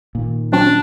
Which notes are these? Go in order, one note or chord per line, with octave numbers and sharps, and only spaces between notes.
A#2 D#3
F#3 C#4 D4